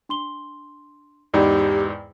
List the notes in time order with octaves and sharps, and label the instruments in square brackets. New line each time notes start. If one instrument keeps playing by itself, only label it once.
[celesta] D4 C6 G7
[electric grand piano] E2 G#2 D#4 [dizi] G4 [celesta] D5 G5 B5